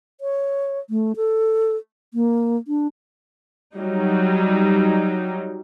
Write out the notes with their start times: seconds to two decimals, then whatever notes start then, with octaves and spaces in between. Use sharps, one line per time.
0.21 C#5
0.90 A3
1.16 A4
2.14 A#3
2.68 D4
3.77 F#3 G3 D#4